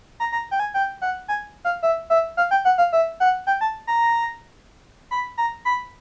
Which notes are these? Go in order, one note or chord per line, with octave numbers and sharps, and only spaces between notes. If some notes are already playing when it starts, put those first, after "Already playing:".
A#5
A#5
G5
G#5
G5
F#5
G#5
F5
E5
E5
F5
G5
F#5
F5
E5
F#5
G5
A5
A#5
B5
A#5
B5